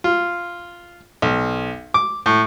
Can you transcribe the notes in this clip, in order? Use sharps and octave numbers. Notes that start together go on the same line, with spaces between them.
F4
B1
D6
A2